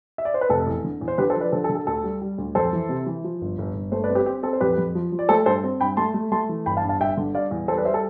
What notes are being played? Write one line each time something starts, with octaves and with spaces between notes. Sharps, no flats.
E5
D5
C5
B4
F1 A4
E2
D3
E2
C5
D3 G4 B4
A4 C5
F3 B4 D5
D3 A4 C5
A4
D3
A4
D2 A4
G3
G3
D2
F2 A4 C5
E3
C3
E3
F3
G1
G1
G1
A3 A4 C5
B4 D5
C4
G4 B4
C4 G4
C4 A4
C5
F2 G4 B4
F2
F3
F3
D5
A3 A4 C5
G2 A4 C5
C4
G2 G5 B5
A3 A5 C6
A3
A3 A5 C6
E3
G1 G5 B5
F5 A5
G2
F5 A5
G1 E5 G5
D3
G3 D5 F5
E2
G3 A4 C5
B4 D5
G3 C5 E5
A4